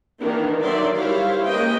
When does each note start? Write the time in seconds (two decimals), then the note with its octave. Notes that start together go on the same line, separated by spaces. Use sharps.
0.20 D#3 E3 A#3 D4 A#4
0.60 D3 D#3 F#3 D5 E5 C6
0.97 G3 E4 C5 C#5 E5 F5
1.46 G#3 A#3 C#4 B4 D#5 G5